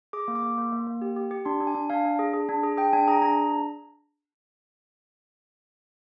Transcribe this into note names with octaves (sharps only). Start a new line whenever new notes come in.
G#4 D6
A#3
D6
A#3
A#3
A#3
A#3
G4
G4
G4
D4 C6
D4
G#5
D4
D4 F5
D4
G#4
G#4
D4
G#4
G#4 G5
D4 G#5
G#4 A#5
D4 A#5